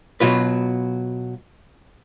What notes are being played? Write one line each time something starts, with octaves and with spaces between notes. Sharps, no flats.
B2 F#3 F4 B4